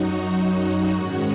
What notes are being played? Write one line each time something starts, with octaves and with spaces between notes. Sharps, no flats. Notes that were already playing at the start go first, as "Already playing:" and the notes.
Already playing: F#2 F#3 D#4 F#4
G#2 D#3 G#3 C#4 F#4